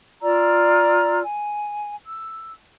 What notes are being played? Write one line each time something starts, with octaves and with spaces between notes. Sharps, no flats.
F4 D5 A#5 E6
G#5
E6